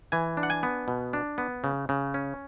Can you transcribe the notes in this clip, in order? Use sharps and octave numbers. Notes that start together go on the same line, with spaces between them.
E3 G#5
D4
F#5
G#5
B3
B2
D4
B3
C#3
C#3
C#4